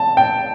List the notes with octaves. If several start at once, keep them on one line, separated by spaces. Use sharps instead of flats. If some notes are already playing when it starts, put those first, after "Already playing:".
Already playing: A5
G5